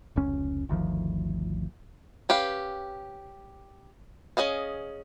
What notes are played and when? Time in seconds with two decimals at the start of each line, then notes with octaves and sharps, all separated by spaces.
0.16 F1 C#2 C#4
0.69 G1 D2 D#3 F3
2.29 C#4 G4 B4 F5
4.37 C#4 G#4 D#5 F5